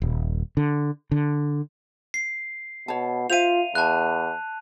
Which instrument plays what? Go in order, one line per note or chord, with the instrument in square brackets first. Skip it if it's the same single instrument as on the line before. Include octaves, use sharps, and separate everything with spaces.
[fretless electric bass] D#1
D3
D3
[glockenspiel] C7
[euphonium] B2 [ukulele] C#5 A5
[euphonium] F4 [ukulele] C5 E5 F5 [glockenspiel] D#7 F7
[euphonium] E2 [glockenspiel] A5 F#6